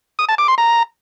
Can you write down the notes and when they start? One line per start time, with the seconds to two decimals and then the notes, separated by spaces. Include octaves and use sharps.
0.19 D#6
0.29 A5
0.38 D6
0.48 C6
0.58 A#5